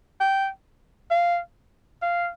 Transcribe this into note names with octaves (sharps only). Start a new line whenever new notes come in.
G5
F5
F5